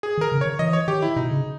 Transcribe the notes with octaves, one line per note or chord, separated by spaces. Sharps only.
G#4
D#3 A#4
C#3
D#3 C#5
E3 D#5
C#5
D#3 G4
E4
B2 D#4
C#3